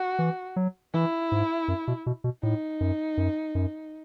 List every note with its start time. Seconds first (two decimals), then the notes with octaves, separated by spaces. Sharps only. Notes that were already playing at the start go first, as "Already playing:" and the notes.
Already playing: F#4
0.19 E3
0.56 F#3
0.94 E3 E4
1.32 G#2
1.68 F#2
1.88 B2
2.06 B2
2.24 B2
2.43 A2 D#4
2.81 F#2
3.17 F#2
3.55 F#2